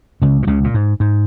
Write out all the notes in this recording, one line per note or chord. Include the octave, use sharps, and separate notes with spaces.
C#2 C#3
A#2
C#2 C#3
A#2
G#2
G#2